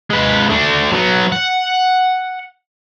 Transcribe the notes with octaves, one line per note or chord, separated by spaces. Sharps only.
G#3 B4
A3 D4
F#3 B3
F#5